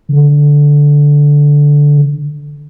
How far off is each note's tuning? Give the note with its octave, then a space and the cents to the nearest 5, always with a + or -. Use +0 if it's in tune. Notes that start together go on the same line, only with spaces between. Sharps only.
D3 -10